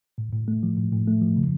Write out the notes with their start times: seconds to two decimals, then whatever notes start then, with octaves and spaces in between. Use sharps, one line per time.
0.18 A2
0.32 A2
0.48 A3
0.63 F3
0.77 A2
0.93 A2
1.07 A3
1.22 F3
1.36 C#3